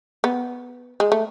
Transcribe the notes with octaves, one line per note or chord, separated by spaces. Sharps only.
B3
G#3
A3